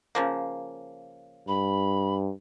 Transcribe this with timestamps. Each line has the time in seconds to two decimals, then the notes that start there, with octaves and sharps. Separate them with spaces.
0.15 C#3 F3 A#3
1.48 G2 B5